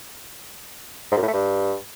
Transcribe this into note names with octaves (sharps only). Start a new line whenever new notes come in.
G#2
F#2
A2
A3
G2